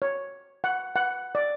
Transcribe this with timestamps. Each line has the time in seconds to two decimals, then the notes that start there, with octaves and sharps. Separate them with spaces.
0.02 C#5
0.64 F#5
0.96 F#5
1.35 D5